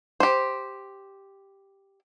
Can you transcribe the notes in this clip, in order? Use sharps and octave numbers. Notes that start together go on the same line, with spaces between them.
G4 C5